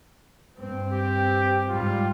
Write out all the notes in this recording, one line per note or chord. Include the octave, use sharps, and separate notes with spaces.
G2 C4
G4
G#2 G3 F4